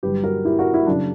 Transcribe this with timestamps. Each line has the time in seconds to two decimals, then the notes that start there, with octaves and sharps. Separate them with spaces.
0.03 G1 G2 F#3 G4 B4
0.24 F#4 A#4
0.45 E4 G4
0.59 F#4 A#4
0.74 E4
0.87 F#1 C#3 D4